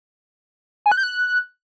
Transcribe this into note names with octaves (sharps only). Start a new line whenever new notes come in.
G#5
F#6
G6
F#6